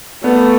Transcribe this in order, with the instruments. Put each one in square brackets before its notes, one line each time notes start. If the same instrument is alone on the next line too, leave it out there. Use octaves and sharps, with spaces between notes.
[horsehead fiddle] A3 [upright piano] B3